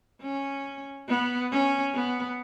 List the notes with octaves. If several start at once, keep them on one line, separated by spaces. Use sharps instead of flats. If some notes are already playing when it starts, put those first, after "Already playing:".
C#4
B3
C#4
B3